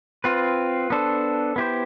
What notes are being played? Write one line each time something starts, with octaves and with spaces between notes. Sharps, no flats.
C4 F4 B4
B3 D4 A4 C5
B3 E4 G4 C5